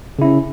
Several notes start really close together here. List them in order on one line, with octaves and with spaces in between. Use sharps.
C#3 E4 C#4